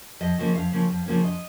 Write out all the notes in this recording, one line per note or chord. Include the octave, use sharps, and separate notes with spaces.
F2 D#5
C#3 F3 A#3 C#4
F2 F5
C#3 F3 A#3 C#4
F2
C#3 F3 A#3 C#4
F2 D#5